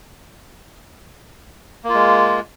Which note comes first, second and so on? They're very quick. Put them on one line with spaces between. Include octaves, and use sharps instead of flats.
A#3 F4 G#3